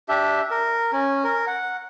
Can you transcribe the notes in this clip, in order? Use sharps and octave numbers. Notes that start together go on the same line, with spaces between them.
D4 G4 E5
A#4
C#4
A#4
F#5